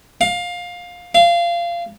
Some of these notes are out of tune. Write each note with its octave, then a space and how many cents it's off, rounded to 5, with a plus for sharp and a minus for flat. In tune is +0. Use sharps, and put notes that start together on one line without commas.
F5 +20
F5 -20